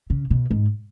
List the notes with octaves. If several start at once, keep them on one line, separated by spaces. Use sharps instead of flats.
C#3
B2
G#2